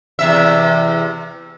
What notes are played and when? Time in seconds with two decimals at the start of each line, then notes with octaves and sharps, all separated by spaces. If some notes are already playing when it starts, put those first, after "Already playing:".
0.19 E2 C3 E5